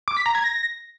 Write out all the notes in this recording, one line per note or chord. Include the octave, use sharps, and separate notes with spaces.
D6
B6
A#5
G#6
A#6